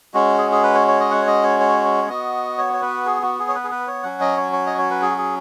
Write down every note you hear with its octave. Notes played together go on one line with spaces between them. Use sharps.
G#3 C#4 F#4
G#4
G#4
B4
C#5
C#5
D#5
F#5
C#5
D#5
C#5
C#5
C#5
B3 F#4 D#5
C#5
C#5
B4
G#4
F#4
G#4
C#5
B4
G#4
B4
C#5
F#3 C#4 F#4 F#5
D#5
C#5
C#5
D#5
C#5
B4
G#4
F#4
G#4